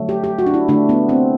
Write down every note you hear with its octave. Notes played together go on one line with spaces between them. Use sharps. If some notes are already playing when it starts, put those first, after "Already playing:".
Already playing: D3 F#3 A3
G4
G4
F#4
D4
E4
D3 A3 D4
B3
C4